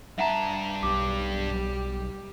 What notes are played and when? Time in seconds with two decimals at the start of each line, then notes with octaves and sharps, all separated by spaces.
0.18 G2 E5 F#5 A5 A#5
0.83 B1 G3 G4 D6